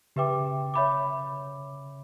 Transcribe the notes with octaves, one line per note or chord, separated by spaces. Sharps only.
C#3 G4 B4 E5 G5 D6
C#5 E5 B5 D6